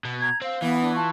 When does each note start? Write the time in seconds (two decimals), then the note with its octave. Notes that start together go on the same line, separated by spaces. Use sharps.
0.05 B2
0.21 A#5 G#6
0.42 C4 F5
0.62 E3 B3
0.81 D4
0.94 F4 A5 C#6